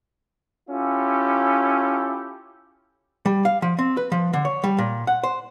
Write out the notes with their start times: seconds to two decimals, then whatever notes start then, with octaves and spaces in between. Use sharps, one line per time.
0.70 C#4 E4 F4 G4 A4
3.26 G3
3.45 F5
3.62 F3
3.79 C4
3.97 B4
4.12 F3
4.33 D3
4.45 C#5
4.64 G3
4.78 A#2
5.07 F#5
5.23 C5